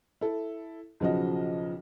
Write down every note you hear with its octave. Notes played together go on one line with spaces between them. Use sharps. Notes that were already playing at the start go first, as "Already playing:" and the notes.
E4 A4
B1 C#3 F3 F#4 D#5